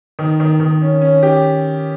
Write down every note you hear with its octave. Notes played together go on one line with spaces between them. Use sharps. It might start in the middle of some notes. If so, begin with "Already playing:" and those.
D#3
D#3
D#3
C#4
C#4
G4